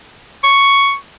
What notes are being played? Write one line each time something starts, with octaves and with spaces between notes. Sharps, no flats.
C#6